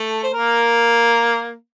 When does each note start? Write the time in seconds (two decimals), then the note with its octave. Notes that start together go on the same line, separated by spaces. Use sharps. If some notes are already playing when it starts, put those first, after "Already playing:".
Already playing: A3 A4
0.23 C5
0.34 A#3 A#4